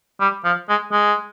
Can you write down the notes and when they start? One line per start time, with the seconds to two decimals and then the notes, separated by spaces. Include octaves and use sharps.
0.20 G3
0.45 F3
0.68 G#3
0.91 G#3